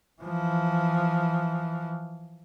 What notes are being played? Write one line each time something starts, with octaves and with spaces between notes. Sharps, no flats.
E3 F3